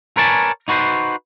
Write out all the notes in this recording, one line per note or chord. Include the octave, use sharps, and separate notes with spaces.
A#4 B4 C#5 D5 G#5 A5
D#4 F#4 B4 C5